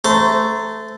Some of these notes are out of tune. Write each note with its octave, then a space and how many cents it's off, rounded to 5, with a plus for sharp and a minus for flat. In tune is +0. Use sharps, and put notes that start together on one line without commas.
A3 +0 C5 -30 A#5 -5